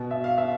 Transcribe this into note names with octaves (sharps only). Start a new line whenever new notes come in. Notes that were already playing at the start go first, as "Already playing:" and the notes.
Already playing: B2
E5
F5
E5